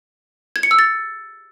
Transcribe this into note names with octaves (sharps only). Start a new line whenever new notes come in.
G#6
C#7
E6
A6